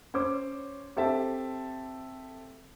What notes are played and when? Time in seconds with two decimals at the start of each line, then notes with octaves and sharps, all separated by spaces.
0.14 C#4 C5 C#5 D6
0.96 C4 G4 A4 C5 E5 A5